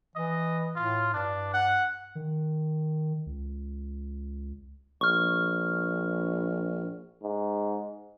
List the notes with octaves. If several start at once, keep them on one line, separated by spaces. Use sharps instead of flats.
E3 D#5
A2 F4
G2 D4
F#5
D#3
C#2
A#1 C#6 F6
G#2